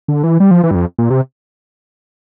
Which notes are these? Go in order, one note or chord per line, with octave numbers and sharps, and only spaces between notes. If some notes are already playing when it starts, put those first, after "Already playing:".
D3
E3
G3
F3
E3
G2
F2
A#2
C3